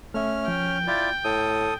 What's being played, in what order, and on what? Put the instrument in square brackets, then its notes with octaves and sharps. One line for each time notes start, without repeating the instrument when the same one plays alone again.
[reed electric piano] A3 E5 [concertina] C#4 F6
[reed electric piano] F3 [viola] G5
[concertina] E4 F4 D5 [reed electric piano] G6
[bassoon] A2 [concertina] A4 D#6